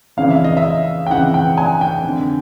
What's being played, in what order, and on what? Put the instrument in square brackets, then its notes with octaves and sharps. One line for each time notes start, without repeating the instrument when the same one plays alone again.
[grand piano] F2 C#3 E3 F5
E5
D#5
E5
G5
F2 C#3 E3 F#5
G5
G#5
G5
F2 D3